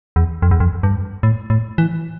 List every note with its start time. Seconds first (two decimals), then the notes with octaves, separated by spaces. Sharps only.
0.16 E2
0.42 F2
0.51 E2
0.60 F2
0.83 G2
1.23 A2
1.50 A2
1.78 E3